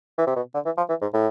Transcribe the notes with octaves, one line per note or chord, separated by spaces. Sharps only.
E3
C3
B2
D3
E3
F3
E3
G#2
A2